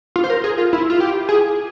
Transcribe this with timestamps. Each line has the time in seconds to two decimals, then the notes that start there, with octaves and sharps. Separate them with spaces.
0.16 F4
0.24 C5
0.30 A#4
0.44 G#4
0.58 F4
0.73 E4
0.90 F4
1.00 G4
1.29 G#4